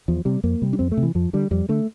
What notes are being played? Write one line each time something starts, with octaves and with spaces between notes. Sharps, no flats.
E2 F3
C3 G3
F2 A#3
C3 G3
D4
F2 C4
A3
C3
E3
F2 F3
D3 G3
F2 G3
D3 A3